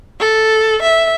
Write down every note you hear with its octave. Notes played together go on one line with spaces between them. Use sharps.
A4
E5